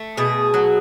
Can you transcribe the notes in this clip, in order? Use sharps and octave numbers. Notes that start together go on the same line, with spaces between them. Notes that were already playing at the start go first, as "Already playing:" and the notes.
Already playing: A3
B2 G#4
F#3